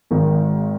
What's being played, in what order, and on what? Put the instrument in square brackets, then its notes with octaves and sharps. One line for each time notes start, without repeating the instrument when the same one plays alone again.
[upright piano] G#1 G#2 D#3